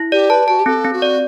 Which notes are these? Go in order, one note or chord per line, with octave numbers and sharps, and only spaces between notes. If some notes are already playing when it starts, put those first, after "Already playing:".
Already playing: E4
G4 D5
B4 A5
F#4 A5
G4
C4 A4
C4
F#4
D5